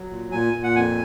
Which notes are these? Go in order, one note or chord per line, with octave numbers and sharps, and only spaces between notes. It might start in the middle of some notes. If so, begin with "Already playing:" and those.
Already playing: F#3
A#2
A#2 G#5
A#2
F#5
F2 G#5